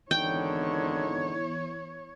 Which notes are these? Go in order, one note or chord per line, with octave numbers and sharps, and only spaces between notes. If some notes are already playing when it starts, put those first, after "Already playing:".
G#1 D3 E3 B3 D#4 E4 C#5 G5